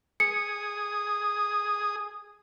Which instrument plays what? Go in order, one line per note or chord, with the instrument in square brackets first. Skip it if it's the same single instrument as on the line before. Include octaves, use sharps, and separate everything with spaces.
[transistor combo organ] G#4 D#6 [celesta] C#7